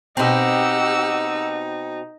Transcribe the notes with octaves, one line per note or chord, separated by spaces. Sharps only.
B2 C4 D#4 G4 F#5 E6